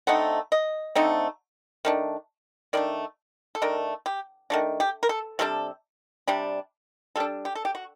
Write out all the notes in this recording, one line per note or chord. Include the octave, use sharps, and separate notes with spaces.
D3 A3 C4 D#4 F#5
D#5
D3 A3 C4 D#4
D#3 A3 D4
D#3 A3 D4 D5
A4
D#3 A3 D4 A#4
G4
D#3 A3 D4 F#4
G4
A#4
A4
C3 G3 D4 A4
C3 G3 D4
G3 D4 A4
G4
A4
G4
F#4